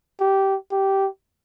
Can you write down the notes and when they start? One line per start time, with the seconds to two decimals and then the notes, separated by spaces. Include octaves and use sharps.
0.21 G4
0.72 G4